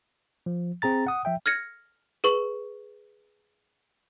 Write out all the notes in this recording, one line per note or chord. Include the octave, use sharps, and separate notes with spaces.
F3
C4 G#4 A#5 A6
F#5 D#6
F3 E5 G5
F6 G#6 A#6 C#7
G#4 B4 C#6 F#7